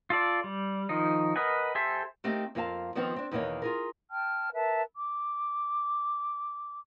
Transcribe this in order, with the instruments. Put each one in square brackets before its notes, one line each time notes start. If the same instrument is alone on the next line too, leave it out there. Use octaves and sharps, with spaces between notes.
[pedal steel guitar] F4 A4 D5
G3
D#3 F3 D#4
A#4 B4 D#5 F#5 G#5
G4 A4 C5 E5 G#5
[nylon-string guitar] A3 A#3 C4 D#4 G4
F2 A#3 F4 F5 G#5 A5
D#3 F3 B3 C4 F4
C4 D4
E2 B2 D#3 A#3 C#5
F4 G#4 A#4
[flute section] G5 A5 F6
A#4 B4 E5 A5
D6